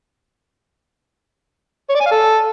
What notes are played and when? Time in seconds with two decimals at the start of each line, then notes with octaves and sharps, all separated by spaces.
1.90 C#5
1.95 D5
2.00 G#5
2.06 F5
2.11 A4